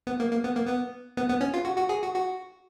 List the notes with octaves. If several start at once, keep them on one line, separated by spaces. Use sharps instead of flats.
B3
A#3
A#3
B3
A#3
B3
B3
B3
C#4
F4
F#4
F#4
G#4
F#4
F#4